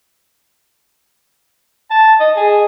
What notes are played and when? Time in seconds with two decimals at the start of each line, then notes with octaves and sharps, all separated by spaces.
1.90 A5
2.20 D#5
2.37 G#4